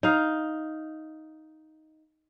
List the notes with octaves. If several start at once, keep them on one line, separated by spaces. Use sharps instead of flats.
D#4 F5